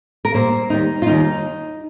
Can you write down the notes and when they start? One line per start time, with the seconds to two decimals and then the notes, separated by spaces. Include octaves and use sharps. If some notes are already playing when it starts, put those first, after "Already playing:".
0.25 A#4
0.34 A#2 G3 A#3 C5
0.70 D#2 D#3 G3 D#4
1.02 F4
1.07 D#2 D#3 G3 D#4